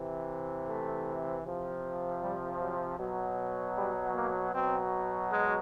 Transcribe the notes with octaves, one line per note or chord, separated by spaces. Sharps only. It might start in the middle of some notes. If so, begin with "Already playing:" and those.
Already playing: C3 E3
A3
C3 F3
G3
F#3
B2 F#3
G3
A#3
B2 F#3 C4
G#3